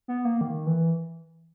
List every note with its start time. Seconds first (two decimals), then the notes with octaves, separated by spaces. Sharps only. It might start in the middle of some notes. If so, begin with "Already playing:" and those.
0.08 B3
0.25 A#3
0.41 D#3
0.67 E3